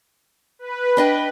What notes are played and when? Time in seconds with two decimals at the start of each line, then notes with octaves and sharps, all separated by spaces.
0.59 B4
0.97 D4 D#5 G5